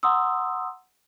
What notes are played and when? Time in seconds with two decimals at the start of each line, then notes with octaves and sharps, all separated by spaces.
0.03 F#5 A#5 C6 D#6 E6